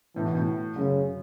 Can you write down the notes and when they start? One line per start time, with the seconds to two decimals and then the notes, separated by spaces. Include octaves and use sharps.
0.16 A2 E3
0.25 B2
0.35 A2
0.76 F#2 C#3